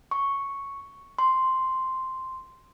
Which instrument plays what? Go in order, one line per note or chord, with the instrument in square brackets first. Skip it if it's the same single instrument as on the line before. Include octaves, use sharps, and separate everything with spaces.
[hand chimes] C#6
C6